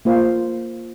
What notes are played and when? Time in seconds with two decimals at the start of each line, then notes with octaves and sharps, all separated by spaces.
0.05 A#3 F4 C5 F5